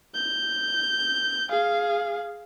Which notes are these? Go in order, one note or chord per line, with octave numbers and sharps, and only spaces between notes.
G6
G#4 F5